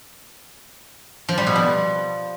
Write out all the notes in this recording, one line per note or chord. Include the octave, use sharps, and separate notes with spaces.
F3
G3
B2
F3